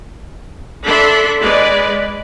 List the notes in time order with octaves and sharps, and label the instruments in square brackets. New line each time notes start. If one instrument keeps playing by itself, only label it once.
[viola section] D4 A4 E5 B5 C6
G#3 B4 D5